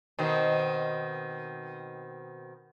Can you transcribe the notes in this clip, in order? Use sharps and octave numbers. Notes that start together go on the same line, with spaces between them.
B2 D#3 C4